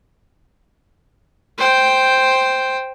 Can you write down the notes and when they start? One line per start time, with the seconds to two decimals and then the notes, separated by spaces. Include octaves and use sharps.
1.58 C5 G5